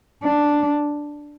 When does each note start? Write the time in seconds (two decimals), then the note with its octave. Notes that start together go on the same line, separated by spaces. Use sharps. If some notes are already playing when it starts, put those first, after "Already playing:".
0.24 D4